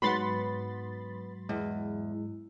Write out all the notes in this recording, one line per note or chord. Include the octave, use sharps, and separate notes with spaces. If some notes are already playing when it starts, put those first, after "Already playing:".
G#2 F#3 B3 F#5 B5 C6 A6
E2 G#3